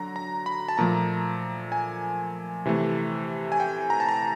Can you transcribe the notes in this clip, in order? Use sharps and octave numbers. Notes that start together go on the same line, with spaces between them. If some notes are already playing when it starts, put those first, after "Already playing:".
Already playing: D3 F#3 A#5
A#5
B5
A5
A#2 F3 A3 A#5
G#5
C3 E3 A3
G#5
G5
A#5
A5
A#5